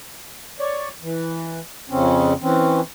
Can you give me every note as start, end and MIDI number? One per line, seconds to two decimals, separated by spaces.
0.60 0.89 73
0.60 0.89 74
1.02 1.60 52
1.90 2.33 41
1.90 2.33 49
1.90 2.33 60
1.90 2.33 61
2.42 2.81 52
2.42 2.81 60
2.42 2.81 61